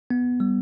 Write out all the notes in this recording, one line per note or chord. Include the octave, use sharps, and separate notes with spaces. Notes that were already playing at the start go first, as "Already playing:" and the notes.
B3
G3